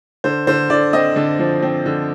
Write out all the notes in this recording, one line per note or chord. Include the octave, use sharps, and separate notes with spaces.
D3 C5
D3 C5
D3 D5
C4 D#5
D3
F3
C4
D3